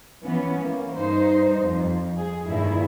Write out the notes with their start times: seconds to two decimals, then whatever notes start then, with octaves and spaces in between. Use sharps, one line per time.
0.24 E3 B3 C#4
0.61 A#3
0.95 G2 D#4 C5
1.62 F2
2.17 G#4
2.48 G2 A#2 D#3 E4